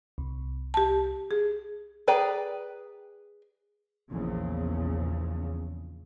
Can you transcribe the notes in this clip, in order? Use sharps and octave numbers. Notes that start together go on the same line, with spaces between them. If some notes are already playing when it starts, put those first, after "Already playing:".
C2
G4 A5
G#4
G#4 B4 D5 G5 A#5
A#1 E2 C#3